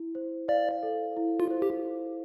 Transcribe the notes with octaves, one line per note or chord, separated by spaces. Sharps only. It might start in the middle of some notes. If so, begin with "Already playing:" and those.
Already playing: E4
C5
D5 F5
A4
E4
F4
C5
G4